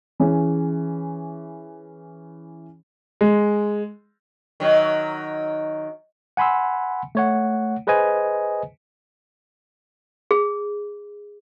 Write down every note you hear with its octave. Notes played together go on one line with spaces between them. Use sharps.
E3 C#4 G#4
G#3
D#3 F#3
F#5 G#5 B5 C6 E6
A3 C#5 F#5
G#4 B4 C5 D#5 G#5
G#4